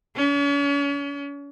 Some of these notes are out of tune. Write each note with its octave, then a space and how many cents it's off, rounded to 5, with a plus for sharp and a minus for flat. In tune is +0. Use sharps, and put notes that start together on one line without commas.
C#4 +40